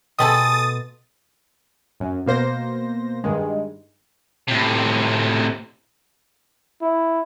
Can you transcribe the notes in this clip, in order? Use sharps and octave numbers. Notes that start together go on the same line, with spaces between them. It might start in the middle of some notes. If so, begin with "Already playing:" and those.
B2 G3 A3 G#4 A4 C6 D#6 A6
F#2
B2 A#3 C5 A#6
G2 D#3 G#3
A2 C3
E4